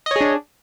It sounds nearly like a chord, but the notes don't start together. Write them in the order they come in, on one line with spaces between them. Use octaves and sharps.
D#5 C#5 G#4 D4